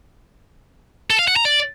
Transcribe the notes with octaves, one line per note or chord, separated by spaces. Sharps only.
A4
F5
F#5
A#5
D5